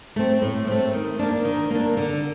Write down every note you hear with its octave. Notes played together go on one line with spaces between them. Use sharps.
A3 C4
A2
A3 C4
D#3
A#3 D4
D#3
A#3 D4
D3